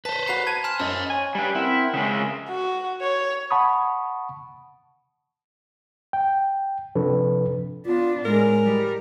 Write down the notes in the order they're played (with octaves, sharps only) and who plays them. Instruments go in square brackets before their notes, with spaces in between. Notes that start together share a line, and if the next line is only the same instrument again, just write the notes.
[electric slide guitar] B4 C5 [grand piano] A5 [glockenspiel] B6
[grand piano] F#4 C7 [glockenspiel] A#5 B5 F#6
[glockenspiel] A5 [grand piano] G#6 D#7
[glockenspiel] G#5 C6 F6 [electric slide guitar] A5
[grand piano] F#2 [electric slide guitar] C5 D#5 [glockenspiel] F6
[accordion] C#5 A#5 [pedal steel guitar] G#5
[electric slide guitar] G3 B4 [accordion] C#4
[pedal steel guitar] C4 [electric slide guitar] E4 [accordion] A#4 F#5 G5
[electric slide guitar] C#3 G#3 [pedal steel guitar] E5
[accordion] F3 G#4 A#4
[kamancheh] F#4
C#5
[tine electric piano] F#5 A5 B5 C#6 D#6
[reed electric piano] G5
C3 F3 D4 A4 B4
[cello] B3 D4 [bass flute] F4
[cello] A2 [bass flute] G#3 [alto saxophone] A#4
[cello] G3